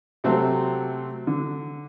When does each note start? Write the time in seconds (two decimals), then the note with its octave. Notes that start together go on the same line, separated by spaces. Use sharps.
0.24 C3 F#3 A3 C4 F#4 A4
1.27 D3